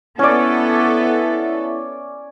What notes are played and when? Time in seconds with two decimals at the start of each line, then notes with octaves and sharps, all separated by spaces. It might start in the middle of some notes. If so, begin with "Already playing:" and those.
0.19 B3 C#4 E4 A4 D5